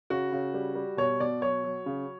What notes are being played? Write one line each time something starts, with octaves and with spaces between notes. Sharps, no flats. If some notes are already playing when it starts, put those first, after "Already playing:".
C#3 F#4
C#3
G3
G3
B2 C#5
B2 D5
F#3 C#5
F#3
C#3